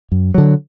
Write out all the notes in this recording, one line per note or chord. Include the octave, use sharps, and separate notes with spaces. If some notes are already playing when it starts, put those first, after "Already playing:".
F#2
D3 F#3